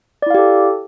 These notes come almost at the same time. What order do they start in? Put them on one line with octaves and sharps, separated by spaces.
D5 E4 F5 G4 A4